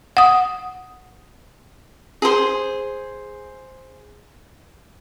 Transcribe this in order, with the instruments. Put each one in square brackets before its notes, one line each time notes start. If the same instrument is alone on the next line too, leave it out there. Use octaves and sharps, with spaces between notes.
[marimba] F#5 D#6
[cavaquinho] G#4 C5